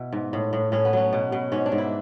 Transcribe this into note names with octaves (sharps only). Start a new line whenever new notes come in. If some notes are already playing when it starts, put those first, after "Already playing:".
Already playing: B2 E4
G#2
A2
A2
A2 C#4
B3
F#3 C#4
B2
B2
G#2 C#4
D4
G#2
E4